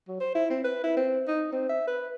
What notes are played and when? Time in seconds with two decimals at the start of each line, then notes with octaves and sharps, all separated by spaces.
0.08 F#3
0.20 C5
0.35 E4
0.50 C4
0.64 B4
0.84 E4
0.97 C4
1.28 D#4
1.52 C4
1.69 E5
1.87 B4